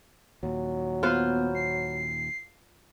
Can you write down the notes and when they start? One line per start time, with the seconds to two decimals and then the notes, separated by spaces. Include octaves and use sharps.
0.43 D#2 A#2 F#3
1.03 B3 F4 B4 C5
1.55 C7